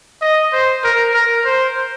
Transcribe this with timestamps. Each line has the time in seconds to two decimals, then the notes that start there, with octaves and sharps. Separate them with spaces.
0.21 D#5
0.52 C5
0.84 A#4
1.13 A#4
1.45 C5